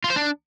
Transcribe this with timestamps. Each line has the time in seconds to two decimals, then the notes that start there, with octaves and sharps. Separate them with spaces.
0.04 F4
0.10 C5
0.16 D4